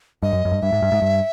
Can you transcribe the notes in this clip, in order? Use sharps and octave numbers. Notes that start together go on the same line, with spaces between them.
G2 D#5
F#2
F#2
G2
G2 E5
G#2
G2
G#2
G2